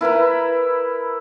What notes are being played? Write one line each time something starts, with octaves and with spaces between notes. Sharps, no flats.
E4 A#4 B4 B5